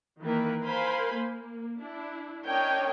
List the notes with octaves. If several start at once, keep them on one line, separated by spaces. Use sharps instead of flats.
D#3 E3 A#3 A#4 B4
A#4 C5 F5 G#5 B5 C6
A#3
D4 E4
C#4 D4 A#4 C#5 D#5 G5